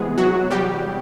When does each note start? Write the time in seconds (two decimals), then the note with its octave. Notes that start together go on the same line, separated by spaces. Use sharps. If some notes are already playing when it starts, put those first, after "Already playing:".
Already playing: C3 E3 G#3 B3 G#4
0.18 F#3 F#4
0.51 G3 G4